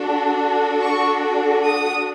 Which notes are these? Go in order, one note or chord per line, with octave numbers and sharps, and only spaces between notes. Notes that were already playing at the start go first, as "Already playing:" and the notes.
Already playing: D4 F#4 A4
C#6
D#6